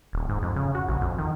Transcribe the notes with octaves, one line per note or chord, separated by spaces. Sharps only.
D#1
G#2
F2
C#3
F#4
A#1
F2
D#3